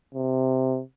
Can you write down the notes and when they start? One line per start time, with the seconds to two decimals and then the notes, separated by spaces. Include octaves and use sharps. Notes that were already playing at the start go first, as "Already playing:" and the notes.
0.15 C3